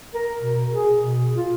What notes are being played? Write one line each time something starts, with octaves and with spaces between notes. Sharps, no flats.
A#4
B2
G#4
B2
F4